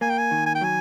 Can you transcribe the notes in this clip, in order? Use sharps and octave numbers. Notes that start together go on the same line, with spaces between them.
A#3 G#5
G5
G#5
D#3
G#5
G5
F#3 G#5